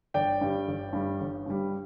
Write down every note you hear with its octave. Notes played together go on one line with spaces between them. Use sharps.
G1 D5 G5
G2 G3
G1
G2 G3
G1
G2 G3